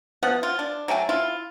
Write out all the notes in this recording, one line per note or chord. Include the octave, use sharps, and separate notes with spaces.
F3 B3 F#5
F4
D4
F#3 A3 G5 G#5
E4 F4